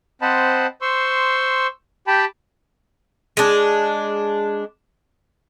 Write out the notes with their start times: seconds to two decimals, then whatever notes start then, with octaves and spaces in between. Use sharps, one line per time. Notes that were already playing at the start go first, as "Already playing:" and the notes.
0.22 C4 C5 D#5 F#5 A5 B5
0.82 C5 C6 C#6 E6
2.07 G4 G5 A5 B5
3.37 G#3 D4